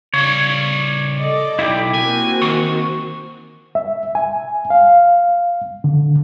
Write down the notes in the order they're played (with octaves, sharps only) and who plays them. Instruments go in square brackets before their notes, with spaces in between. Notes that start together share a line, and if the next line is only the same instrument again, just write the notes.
[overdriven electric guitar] C#3 G3 [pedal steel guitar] C#5
[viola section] A4 D5 D#5
[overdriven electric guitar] B1 [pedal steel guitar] E4 G4
[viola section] A#3 C4 F#4 [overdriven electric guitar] G#5
[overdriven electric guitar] D#3 [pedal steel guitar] C#6
[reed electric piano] E5
G#5
F5
D3